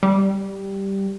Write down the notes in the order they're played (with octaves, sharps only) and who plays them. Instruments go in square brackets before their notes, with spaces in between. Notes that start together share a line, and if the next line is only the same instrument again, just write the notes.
[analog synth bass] G3